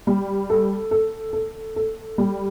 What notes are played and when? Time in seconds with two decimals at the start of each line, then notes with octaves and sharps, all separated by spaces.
0.07 G3
0.50 A4
0.91 A4
1.33 A4
1.76 A4
2.18 G3